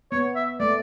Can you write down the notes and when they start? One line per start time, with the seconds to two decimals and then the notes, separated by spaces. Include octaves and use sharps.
0.12 B3 C#5
0.36 E5
0.60 A3 D5